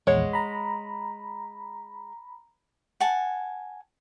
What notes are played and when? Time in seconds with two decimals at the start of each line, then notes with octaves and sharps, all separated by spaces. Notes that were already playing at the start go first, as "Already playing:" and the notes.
0.07 A#1 E2 G#3 C#5 F#5
0.33 A#5 B5
3.00 F#5 G#5 A5